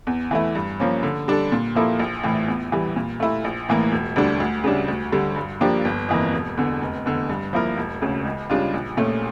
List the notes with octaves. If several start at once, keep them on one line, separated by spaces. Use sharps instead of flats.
E2
E3 A3 E4
G2
F3 A#3 C#4
D3
G3 D4 A4
A#2
F3 A#3 E4 A4
A#1
A2 E3
E2
E3 G3
A#2
A3 E4
A#1
A2 E3 A#3
E1
D2 D3 G3 D4
D2
C#3 G3 D4
D2
D3 G3
G2
F3 A#3 D4 G4
G1
F2 E3 A#3
E1
E2 D3
F1
E2 D3
G2
F3 A#3 E4 A#4
E1
D2 C#3
C#2
C#3 G3 D4 F4
A#1
A#2 A3 C#4